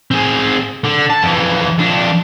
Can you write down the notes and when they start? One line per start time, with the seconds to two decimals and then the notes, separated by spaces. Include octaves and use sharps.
0.11 C4 G#4
0.84 D3
1.10 A5
1.23 F2 E3
1.78 F2 D4